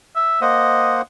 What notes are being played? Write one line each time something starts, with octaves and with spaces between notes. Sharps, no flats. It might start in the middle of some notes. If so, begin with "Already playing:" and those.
E5
A#3 C5 D#5 F#5